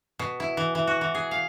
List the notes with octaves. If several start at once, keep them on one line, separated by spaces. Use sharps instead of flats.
B2
E4
E3
E3
F#4
E3
G#4
F5